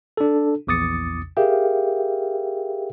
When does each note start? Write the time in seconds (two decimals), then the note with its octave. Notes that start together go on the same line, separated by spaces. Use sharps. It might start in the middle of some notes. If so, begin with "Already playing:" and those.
0.17 D4 A4
0.67 A#1 E2 D6 D#6 A6 C#7
1.37 G4 G#4 A#4 E5 F5 G5